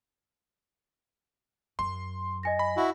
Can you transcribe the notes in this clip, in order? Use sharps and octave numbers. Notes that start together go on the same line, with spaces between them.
F#2 C6
D#5 G#5 A#6
B5
E4 F#4